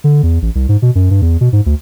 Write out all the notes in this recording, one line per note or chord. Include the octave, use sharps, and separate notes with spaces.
D3
E2
A1
C2
G#2
B2
F#2
G2
E2
B2
G#2
D2